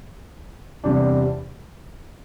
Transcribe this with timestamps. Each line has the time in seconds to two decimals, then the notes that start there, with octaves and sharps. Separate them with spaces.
0.84 E2 C3 G3 D4